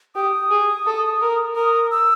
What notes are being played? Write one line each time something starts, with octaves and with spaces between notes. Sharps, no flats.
G4 D#6
G#4
A4
A#4
A#4 D#6
E6